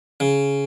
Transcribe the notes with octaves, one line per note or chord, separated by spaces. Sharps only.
C#3